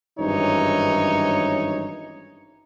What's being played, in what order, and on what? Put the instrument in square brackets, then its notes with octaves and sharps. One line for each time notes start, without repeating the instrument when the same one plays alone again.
[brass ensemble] G#1 G2 E3 C#4 D#4 C#5